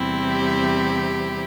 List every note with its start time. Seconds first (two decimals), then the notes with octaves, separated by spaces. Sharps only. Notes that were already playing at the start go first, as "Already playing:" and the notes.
Already playing: E2 C3 G3 C4 E4
0.26 G4